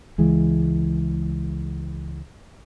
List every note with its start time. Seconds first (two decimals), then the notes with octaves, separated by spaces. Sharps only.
0.18 C#2 E3 G#3